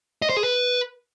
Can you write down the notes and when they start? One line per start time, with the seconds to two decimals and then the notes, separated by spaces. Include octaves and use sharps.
0.22 D#5
0.29 C5
0.37 G#4
0.44 B4